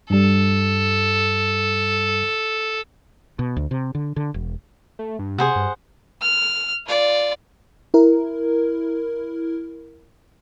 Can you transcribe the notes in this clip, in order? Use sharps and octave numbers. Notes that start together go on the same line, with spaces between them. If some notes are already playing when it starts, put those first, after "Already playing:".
G2 G3 A4
B2
D2
C3
D3
D3
E1
A3
G2
C3 G#4 C5 F#5
G2
F6
F4 D5
E4 A#4